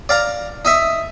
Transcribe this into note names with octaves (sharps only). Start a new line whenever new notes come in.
D5 F5 A#5
D#4 D#5 E5